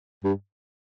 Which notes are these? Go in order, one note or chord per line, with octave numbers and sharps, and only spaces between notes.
G2